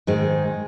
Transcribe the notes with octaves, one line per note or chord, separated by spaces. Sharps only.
G#2 D#3 G#3